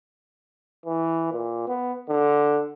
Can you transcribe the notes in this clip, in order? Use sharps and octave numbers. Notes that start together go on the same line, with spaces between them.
E3
A#2
B3
D3